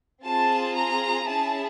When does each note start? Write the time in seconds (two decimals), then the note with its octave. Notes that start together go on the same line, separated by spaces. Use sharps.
0.24 C4 F4 G#4 A5
0.75 A#5
1.27 C#4 E4 G#4 A5